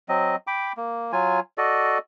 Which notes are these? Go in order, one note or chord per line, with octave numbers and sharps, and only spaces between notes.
F#3 C4 D#5
G5 B5 D6
A#3
F#3 F4 G#5
F#4 A4 D5 D#5